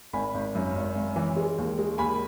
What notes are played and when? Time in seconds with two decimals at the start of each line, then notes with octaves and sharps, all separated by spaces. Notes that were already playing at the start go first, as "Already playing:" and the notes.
0.13 G#1 G#5 B5
0.35 G#1
0.55 F#2
0.76 G#1
0.95 G#1
1.16 E3
1.36 G#3
1.58 D#2
1.79 G#3
1.98 D#2 G#5 B5